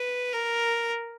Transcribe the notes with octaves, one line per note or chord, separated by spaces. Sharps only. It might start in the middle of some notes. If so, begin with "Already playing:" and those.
Already playing: B4
A#4